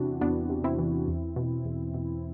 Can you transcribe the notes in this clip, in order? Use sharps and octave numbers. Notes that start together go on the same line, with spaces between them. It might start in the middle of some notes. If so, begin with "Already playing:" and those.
Already playing: E2 C3 E3 C4 D4 E4 F#4
E2 B3 D4
C3
C4 E4
E3
E2
B2
E2
B2